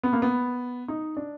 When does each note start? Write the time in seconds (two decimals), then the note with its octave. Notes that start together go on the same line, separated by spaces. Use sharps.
0.03 B3
0.13 A#3
0.22 B3
0.88 D#4
1.17 D4